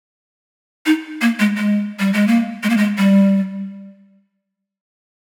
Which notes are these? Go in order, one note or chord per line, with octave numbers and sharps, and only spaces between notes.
D#4
A#3
G#3
G#3
G3
G#3
A#3
G#3
A#3
G#3
G3